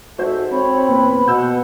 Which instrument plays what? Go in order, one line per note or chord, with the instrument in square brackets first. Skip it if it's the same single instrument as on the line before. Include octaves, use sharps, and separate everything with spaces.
[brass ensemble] G#2 A4 E5 [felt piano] F#4 C5 G6
[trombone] C4 [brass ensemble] C#5 [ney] B5
[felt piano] E2 A#2 [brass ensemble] B4
[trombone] B2 [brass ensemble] F#5 [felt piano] E6 G6